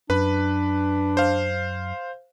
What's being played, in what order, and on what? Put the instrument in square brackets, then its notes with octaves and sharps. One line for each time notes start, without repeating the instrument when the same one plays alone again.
[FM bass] F#2 [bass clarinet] D4 [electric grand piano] B4 B5
[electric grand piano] C5 F5